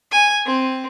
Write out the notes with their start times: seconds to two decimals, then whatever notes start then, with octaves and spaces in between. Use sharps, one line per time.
0.12 G#5
0.46 C4